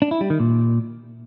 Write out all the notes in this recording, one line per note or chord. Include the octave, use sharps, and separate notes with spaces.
D4
E4
G3
D#3
A#2